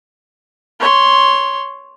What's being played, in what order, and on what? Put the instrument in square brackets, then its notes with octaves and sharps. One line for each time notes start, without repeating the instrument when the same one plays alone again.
[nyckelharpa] C#5 C6